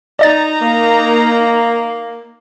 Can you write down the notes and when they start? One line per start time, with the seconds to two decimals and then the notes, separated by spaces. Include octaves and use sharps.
0.19 D#4 D5 D#5 A#5 A6
0.61 A#3